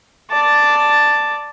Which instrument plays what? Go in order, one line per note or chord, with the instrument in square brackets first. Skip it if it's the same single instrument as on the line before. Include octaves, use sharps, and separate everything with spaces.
[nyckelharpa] D5 A5